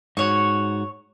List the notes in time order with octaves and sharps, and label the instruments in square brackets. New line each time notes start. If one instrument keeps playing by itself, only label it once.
[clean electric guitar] G#2 F#4 [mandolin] C#5 C#6